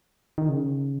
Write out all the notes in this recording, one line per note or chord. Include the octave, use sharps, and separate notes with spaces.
D#3
C#3